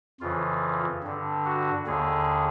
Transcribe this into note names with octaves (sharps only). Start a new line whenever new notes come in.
F2 C#3 E3 F4
G2 D3
F#4
D#2 D3 G#4